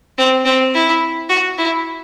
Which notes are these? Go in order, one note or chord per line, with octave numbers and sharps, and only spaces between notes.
C4
C4
E4
F#4
E4